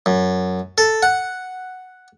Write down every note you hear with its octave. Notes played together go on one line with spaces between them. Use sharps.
F#2
A4
F#5